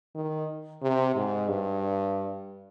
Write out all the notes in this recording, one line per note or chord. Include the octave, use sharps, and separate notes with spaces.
D#3
C3
G#2
G2